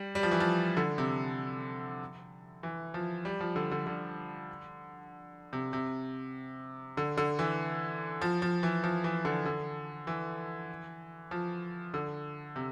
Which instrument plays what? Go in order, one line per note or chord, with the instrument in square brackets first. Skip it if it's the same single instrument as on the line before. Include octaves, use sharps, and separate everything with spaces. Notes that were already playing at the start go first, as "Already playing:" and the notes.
Already playing: [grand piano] G3
G3
F3
E3
F3
D3
C3
E3
F3
G3
F3
D3
D3
D3
C3
C3
D3
D3
E3
F3
F3
E3
F3
E3
D3
D3
E3
F3
D3
C3